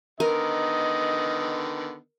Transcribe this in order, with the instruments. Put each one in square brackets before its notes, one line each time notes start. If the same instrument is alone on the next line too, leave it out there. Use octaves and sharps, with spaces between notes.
[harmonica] D3 D#3 B3 [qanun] A#4 [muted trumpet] D#5